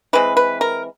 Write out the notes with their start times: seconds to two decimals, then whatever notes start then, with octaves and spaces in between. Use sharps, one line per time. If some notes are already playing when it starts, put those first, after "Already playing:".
0.13 E3 G#3 C4 B4
0.37 B4
0.61 A#4